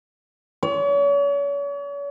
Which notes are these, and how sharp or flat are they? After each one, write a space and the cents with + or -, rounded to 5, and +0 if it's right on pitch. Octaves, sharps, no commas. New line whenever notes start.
C#5 +40